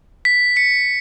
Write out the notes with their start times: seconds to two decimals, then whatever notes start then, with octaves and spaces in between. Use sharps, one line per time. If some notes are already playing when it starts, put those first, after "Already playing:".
0.25 B6
0.56 B6 C#7